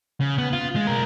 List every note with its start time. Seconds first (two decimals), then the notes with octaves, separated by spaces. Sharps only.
0.21 C#3
0.38 B3
0.53 F4
0.76 G#3
0.87 B1 A#4